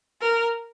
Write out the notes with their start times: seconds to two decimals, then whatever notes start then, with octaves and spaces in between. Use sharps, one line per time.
0.21 A#4